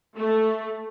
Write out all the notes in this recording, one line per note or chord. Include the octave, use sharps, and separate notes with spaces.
A3